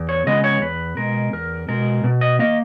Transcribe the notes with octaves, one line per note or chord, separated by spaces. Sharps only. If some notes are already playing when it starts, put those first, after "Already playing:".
Already playing: E2
C#5
C#3 G#3 B3 D#5
C#5
E2 B4
B2 G#3 A#4
E2 A#4
B2 G#3 A#4
B2
D#5
A#3 D#5